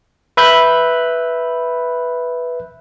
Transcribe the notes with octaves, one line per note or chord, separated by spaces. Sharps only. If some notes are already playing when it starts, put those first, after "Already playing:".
B4 E5 B5 F#6 G6